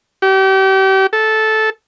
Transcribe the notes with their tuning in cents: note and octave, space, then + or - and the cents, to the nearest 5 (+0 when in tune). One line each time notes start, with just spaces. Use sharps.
G4 -35
A4 -10